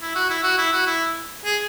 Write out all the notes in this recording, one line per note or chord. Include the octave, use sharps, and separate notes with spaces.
E4
F#4
E4
F#4
E4
F#4
E4
G#4